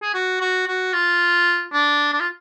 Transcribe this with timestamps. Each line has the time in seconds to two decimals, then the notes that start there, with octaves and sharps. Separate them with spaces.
0.02 G#4
0.14 F#4
0.40 F#4
0.67 F#4
0.93 F4
1.73 D4
2.13 D4
2.20 F4